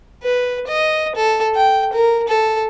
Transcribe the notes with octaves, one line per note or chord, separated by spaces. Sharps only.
B4
D#5
A4
G5
A#4
A4